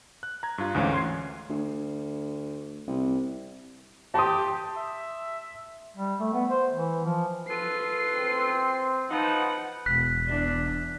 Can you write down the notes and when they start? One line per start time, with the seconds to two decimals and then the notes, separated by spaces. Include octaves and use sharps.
0.23 F#6
0.43 A#5 G#6
0.58 G2 F4
0.75 D2 G#2 E3 C#4 F5
0.94 C6 G#6 C7
1.50 D2
2.87 C2
4.14 G4 A5 C6 D#6
4.77 E5
5.97 G3
6.20 A3
6.34 B3
6.50 C5
6.73 E3
7.05 F3
7.48 F4 A4 B4 C7
8.13 C4
9.11 F3 D#4 B4 F#5
9.86 E1 F#6 B6
10.27 E2 D4